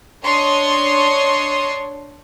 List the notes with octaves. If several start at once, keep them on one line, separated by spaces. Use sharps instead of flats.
D4 C#5 D#5 C6 C#6 D#6